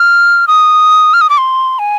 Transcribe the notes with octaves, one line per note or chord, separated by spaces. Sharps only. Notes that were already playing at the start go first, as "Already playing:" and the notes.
Already playing: F6
D#6
F6
D#6
D6
C6
G#5